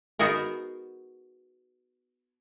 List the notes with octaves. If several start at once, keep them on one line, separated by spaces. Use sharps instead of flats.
B3 D#4 F#4 G#4 A#4